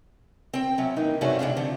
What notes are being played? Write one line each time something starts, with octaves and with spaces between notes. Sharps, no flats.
C4 G5
C3 F#3 C#4
E3 A#3 D#4
G2 C3 A3 C#4 F#4 G#4
C3 G#3 D4 F4
D3 F3